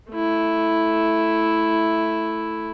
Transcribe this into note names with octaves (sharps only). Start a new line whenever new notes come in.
A3 E4